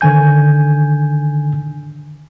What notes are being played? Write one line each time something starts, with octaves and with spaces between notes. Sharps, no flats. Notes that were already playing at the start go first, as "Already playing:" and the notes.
D3 D#3 G#5 G6